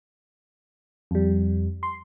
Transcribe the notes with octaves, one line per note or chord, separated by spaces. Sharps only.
F2 G3
C6